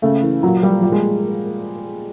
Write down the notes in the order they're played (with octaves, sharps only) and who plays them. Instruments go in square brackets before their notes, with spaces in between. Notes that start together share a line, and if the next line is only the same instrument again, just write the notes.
[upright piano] C#3 A3
E3
A#2 F#3
F3 G3
A#2 G3
G#3